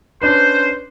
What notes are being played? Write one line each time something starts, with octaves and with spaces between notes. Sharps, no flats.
C#4 D4 B4 C5